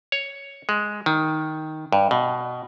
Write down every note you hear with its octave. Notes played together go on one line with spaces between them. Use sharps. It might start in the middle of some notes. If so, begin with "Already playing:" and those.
C#5
G#3
D#3
G2
B2